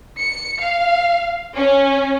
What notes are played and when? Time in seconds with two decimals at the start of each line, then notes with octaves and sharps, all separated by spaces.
0.20 C#7
0.61 F5
1.56 C#4